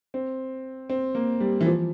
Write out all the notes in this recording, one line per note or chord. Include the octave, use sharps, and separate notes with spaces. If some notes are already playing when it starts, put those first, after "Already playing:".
C4
C4
A#3
G3
E3
F3